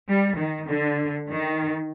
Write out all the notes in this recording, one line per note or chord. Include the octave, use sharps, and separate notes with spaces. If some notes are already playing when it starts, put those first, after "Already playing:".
G3
D#3
D3
D#3